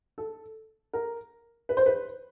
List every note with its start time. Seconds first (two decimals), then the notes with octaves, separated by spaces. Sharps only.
0.18 A4
0.93 A#4
1.69 B4
1.77 C5
1.86 B4